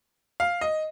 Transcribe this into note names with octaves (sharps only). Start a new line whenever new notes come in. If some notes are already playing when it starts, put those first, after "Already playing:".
F5
D#5